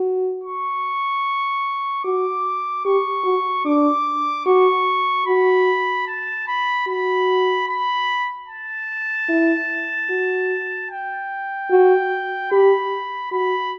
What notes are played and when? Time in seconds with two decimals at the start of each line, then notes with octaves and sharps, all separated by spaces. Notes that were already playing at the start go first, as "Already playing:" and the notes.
Already playing: F#4
0.44 C#6
2.04 F#4 D6
2.85 G4 C#6
3.25 F#4
3.65 D4 D6
4.46 F#4 C#6
5.26 F#4 B5
6.07 A5
6.47 B5
6.87 F#4 B5
7.68 B5
8.48 A5
9.29 E4
10.10 F#4
10.90 G5
11.71 F#4
12.51 G4 B5
13.31 F#4 B5